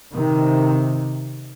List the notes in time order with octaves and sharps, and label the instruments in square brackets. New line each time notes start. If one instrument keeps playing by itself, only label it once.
[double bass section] C3 D#3